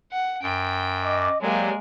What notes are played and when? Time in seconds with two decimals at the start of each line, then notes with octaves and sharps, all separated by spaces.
0.12 F#5
0.43 F#2 G5
1.02 D#5 D6
1.41 F#3 G#3 A#3 G4 D5